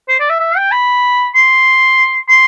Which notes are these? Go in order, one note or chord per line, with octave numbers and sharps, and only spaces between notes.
C5
D5
E5
E5
G5
B5
C6
C6